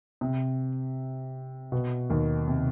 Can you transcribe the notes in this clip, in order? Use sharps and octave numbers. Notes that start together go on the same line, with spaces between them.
C3
B2
D#2 D#3
C3